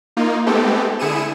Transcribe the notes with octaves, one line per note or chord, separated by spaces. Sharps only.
A#3 D#4 F4
G#3 A3 B3 C4 G4 A4
D3 E4 G#4 C#7 D#7 E7